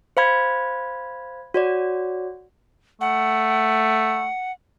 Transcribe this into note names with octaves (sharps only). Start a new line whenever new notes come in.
C5 F5 B5 G#6
F#4 C#5 D5
A3 F#5